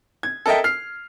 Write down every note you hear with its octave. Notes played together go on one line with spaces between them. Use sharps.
G#6
A4 A#4 D#5 E5 G5
F6 C7